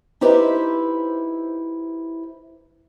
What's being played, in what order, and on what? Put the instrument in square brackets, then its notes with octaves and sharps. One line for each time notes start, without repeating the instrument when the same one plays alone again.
[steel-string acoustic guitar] D#4 E4 G4 B4 C5 E5